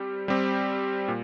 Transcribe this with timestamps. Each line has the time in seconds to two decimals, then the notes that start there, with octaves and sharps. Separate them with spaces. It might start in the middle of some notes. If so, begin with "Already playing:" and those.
Already playing: G3 C4 G4
0.28 G3 C4 G4
1.08 A#2